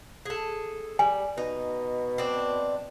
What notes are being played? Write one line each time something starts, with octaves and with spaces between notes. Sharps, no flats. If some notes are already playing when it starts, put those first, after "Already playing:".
G#4 A4
G3 G#5
B2 D#4
C4 D4